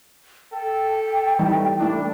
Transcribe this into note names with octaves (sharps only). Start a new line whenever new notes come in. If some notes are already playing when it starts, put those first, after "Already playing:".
A4 G5
E3 G3 A3 D#4
A3 D4 E4